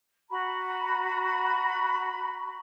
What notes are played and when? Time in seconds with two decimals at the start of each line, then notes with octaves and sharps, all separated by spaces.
0.30 F#4 A#5 B5